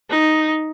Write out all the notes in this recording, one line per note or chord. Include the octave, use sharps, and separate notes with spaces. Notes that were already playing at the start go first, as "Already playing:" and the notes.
D#4